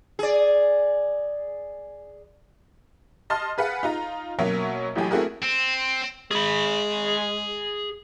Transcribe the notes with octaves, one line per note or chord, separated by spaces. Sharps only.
G#4 D5
D#5 A5 C6 F6 A6
G#4 B4 F5 F#5
D#4 F4 A#5
B2 F#3 A#3 C#4 C#5 E5
A1 A2 F#3 G4 G#5
A3 C4 E4 F#4 G#4 A#4
C4
G#3 G#4 B5